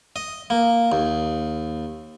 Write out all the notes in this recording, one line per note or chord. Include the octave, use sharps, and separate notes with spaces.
D#5
A#3
D#2